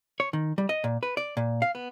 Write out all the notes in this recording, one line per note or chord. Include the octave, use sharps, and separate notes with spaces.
C#5
D#3
G3
D#5
A#2
B4
D5
A#2
F5
B3